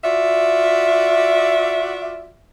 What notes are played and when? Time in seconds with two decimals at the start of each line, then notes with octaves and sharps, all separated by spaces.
0.03 F4 F#4 D5 E5